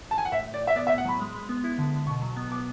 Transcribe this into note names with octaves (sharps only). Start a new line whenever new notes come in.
A5
G#5
F#5
A2 E5
A2
D5
A2
E5
B3 D5
E5
A2
F#5
F#3 B5
G#3
G#3
B3
E4
D3
D3
B2 C#6
F#3
B3
B3 D6